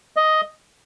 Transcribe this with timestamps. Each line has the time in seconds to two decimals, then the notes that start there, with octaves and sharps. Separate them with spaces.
0.16 D#5